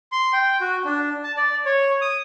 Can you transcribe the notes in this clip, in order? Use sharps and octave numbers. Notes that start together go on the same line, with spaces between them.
C6
G5
F#4
D4
A5
D5
C#5
D#6